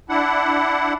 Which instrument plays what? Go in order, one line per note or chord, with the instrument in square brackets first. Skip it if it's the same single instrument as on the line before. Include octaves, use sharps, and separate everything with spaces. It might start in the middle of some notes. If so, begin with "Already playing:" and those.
[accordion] D4 E4 F#5